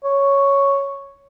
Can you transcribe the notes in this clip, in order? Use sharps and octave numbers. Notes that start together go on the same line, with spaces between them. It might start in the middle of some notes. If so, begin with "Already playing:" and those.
C#5